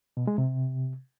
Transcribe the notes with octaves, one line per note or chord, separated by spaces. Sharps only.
B2
G#3
C3